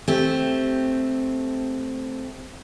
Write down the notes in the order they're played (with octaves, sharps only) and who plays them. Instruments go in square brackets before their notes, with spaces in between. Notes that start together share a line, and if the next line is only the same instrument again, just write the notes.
[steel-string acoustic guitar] A3 C4 G4